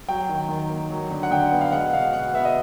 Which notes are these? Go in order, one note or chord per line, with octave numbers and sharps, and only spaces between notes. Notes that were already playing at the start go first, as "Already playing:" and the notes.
F#3 G5
D#3
D#3
A#3
F#3
D3
F#5
D3 G5
B3
F5
G#3 F#5
B2 F5
B2 F#5
B3 E5
D#5